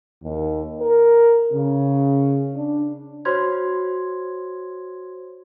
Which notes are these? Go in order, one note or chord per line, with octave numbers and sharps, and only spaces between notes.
D#2
A#4
C#3
D4
F#4 C5 C#5 C6 G#6